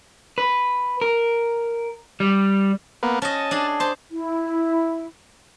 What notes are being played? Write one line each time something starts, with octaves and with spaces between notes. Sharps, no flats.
B4
A#4
G3
A#3 B3
C#4 F#4 D#5 A5
D4 G#4
C5 A5 C6
E4